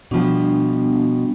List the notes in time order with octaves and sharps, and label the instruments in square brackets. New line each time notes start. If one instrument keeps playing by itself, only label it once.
[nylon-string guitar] B2 F3 [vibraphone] G3 B3 D4